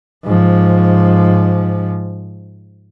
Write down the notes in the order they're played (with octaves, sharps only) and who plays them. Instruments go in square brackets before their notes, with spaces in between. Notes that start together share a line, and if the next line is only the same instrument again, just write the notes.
[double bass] G#2 F3